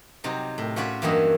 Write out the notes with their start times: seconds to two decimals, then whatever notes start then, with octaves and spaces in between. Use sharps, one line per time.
0.24 C3 F#3 G3 D#4
0.58 A2
0.76 C#4 F4 F#4 C#5 D5 B5
1.02 E2 G2 E3 F#3 A#3 D#5